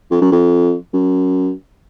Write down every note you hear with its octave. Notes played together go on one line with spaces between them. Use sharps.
F2
F#2
F2
F#2